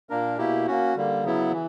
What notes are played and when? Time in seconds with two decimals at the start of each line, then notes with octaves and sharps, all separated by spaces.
0.09 A#2 A#3 D4 A#4
0.38 B2 A#3 E4 G4
0.67 A#3 C#4 F#4
0.96 D3 G3 A#3
1.24 C#3 F#3 B3 E4
1.52 E3